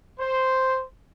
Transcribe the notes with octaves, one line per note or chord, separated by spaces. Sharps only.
C5